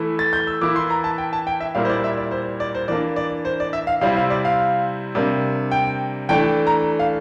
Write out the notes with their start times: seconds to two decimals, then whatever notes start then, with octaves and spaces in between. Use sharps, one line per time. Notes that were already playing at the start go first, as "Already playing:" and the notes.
Already playing: E3 A3 E4
0.19 A6
0.33 G6
0.47 E6
0.61 E3 A#3 E4 D6
0.76 C6
0.90 A#5
1.04 A5
1.18 G5
1.33 A5
1.47 G5
1.60 E5
1.75 A#2 G3 A#3 E4 F5
1.85 C5
1.90 D5
2.04 E5
2.17 D5
2.31 C5
2.60 D5
2.75 C5
2.88 E3 A#3 D4 D5
3.16 D5
3.45 C5
3.60 D5
3.73 E5
3.87 F5
4.01 C3 G3 C4 E4 F5
4.16 F5
4.30 D5
4.45 F5
5.15 C3 G3 A#3 D4
5.71 G5
6.29 E3 A3 D4 G5
6.67 A#5
6.99 F5